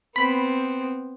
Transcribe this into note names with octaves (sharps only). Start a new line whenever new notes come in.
B3 C4 B5